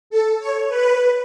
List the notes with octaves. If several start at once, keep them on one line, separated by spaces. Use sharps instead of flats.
A4
C#5
B4